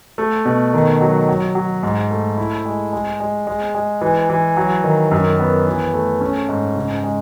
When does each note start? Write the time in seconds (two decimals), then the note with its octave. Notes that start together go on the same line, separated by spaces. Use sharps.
0.18 A3
0.45 B2
0.74 D#3
1.01 F#3
1.29 F#3
1.55 F#3
1.83 G#2
2.11 A3
2.38 E4
2.65 G#3
2.93 G#3
3.20 G#3
3.47 G#3
3.75 G#3
4.02 E3
4.30 E3
4.57 F#3
4.84 D#3
5.11 F#2
5.40 B3
5.67 E3
5.94 A3
6.21 C#4
6.49 G#2
6.75 C#3
7.04 G#3